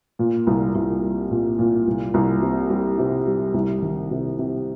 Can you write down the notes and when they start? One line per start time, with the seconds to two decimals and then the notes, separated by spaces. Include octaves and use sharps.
0.19 A#2
0.47 C2
0.75 C2
1.02 G3
1.31 A#2
1.59 A#2
1.87 C2
2.14 C2
2.42 C3
2.70 G3
2.99 C3
3.27 G3
3.54 C2
3.82 D#3
4.11 C3
4.39 C3